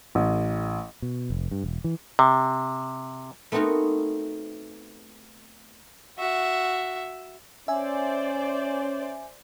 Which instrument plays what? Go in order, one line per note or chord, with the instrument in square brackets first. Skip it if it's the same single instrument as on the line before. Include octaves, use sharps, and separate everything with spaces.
[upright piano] A1
[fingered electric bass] B2
F1
G2
E1
E3
[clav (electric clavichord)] C3
[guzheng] A3 B3 C4 D#4 F#4 A#4
[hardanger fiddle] F#4 E5
[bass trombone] C#4 [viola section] C5 D5 [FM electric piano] E5 G#5